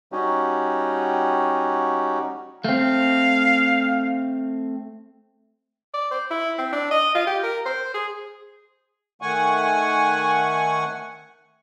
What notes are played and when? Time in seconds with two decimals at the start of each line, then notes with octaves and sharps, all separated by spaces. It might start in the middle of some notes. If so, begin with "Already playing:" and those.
0.12 G3 C#4 D#4 F#4 G4
2.64 A3 C4 F5
5.94 D5
6.11 C5
6.31 E4
6.58 C4
6.72 D4
6.91 D#5
7.15 F4
7.27 G4
7.43 A#4
7.66 C5
7.94 G#4
9.22 D#3 A3 F#5 G#5 C#6